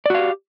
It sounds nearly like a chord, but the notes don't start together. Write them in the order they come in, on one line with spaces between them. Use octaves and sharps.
D5 F#4 F5 G4